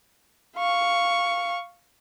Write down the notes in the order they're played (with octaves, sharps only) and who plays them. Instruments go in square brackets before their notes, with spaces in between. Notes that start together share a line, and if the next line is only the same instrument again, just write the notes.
[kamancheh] F5 C#6